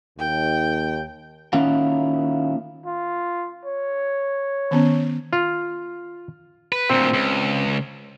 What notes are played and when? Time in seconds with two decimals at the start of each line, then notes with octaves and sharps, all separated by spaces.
0.19 D#2 G5
1.53 D#3 A#3 C#4 E4 F4 F#5
2.86 F4
3.65 C#5
4.71 D#3 B3 C#4
5.33 F4
6.72 B4
6.90 D2 A#2 C4
7.13 C#2